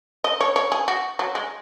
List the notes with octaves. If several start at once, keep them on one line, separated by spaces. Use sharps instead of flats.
D#5
C#5
C#5
G#4
F#4
F#3
G#3